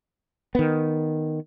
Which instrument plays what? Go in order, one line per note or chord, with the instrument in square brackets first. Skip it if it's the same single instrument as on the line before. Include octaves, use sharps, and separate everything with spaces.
[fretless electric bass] D#3 B3